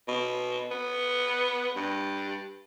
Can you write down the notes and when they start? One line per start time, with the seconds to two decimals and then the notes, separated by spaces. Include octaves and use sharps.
0.08 B2
0.71 B3
1.76 G2